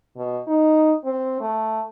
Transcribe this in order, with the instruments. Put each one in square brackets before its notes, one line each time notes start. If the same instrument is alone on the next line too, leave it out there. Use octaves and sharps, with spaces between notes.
[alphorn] B2
D#4
C4
A3